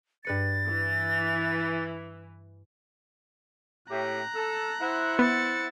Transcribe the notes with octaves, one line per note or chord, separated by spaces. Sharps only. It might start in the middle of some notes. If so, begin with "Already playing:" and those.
G2 B4 A6 C#7
E3
A2 G4 A#5 F#6
A4
E4 C5 F#5
B3 A6 C#7